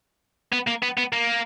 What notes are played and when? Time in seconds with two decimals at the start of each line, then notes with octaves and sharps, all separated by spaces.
0.53 B3
0.68 A#3
0.83 B3
0.98 B3
1.13 A#3